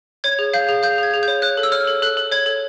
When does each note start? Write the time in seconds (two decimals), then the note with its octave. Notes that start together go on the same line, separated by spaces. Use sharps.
0.24 C#5 G#6
0.39 G#4
0.54 F5 G6
0.69 G#4
0.83 F5 G6
0.98 G#4 G#6
1.14 G#4
1.23 G6
1.28 C#5
1.42 C#5 F#6
1.57 A4
1.63 E6
1.72 C#5 F6
1.87 A4
2.02 A4 F#6
2.17 A4
2.32 C#5 G#6
2.46 A4